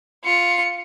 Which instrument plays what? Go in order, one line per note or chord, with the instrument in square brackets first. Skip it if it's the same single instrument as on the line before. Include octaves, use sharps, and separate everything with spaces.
[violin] F4 C#7